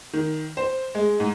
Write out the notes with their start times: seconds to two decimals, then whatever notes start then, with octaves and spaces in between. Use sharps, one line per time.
0.13 D#3
0.57 C5
0.95 G#3
1.20 G#2